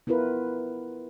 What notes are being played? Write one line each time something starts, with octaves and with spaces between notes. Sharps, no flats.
B3 E4 F4 A#4 B4